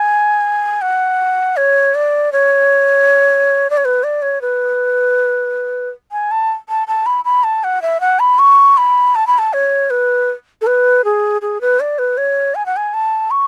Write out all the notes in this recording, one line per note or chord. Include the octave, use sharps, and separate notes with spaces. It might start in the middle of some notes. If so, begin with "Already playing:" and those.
Already playing: G#5
F#5
C#5
D5
C#5
D5
C#5
B4
D5
C#5
B4
G#5
A5
A5
A5
B5
B5
A5
F#5
E5
F#5
B5
C#6
B5
A5
B5
A5
C#5
B4
A4
B4
G#4
G#4
B4
D5
B4
C#5
G#5
F#5
G#5
A5
C#6